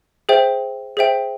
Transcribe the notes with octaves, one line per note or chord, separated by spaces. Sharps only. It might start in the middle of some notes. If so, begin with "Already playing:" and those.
G#4 C5 E5 G5
G#4 C5 E5 G5